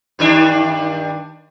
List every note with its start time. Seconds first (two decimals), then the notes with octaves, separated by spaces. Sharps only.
0.19 G2 D#3 D4